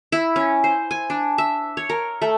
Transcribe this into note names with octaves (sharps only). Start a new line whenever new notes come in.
E4
C#4
C5
G#5
D4
E5
C#5
A#4
A3